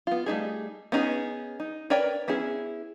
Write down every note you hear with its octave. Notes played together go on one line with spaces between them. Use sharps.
B3 F4
G3 A3 D#4 G#4
B3 C#4 D#4 G#4
D#4
A#4 B4 C#5 D5 G5
B3 C#4 E4 G#4